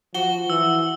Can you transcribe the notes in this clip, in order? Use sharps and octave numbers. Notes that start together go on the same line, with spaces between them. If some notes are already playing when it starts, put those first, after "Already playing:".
F3 F#4 G7
E3 E6